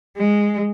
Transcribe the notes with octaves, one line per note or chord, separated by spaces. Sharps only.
G#3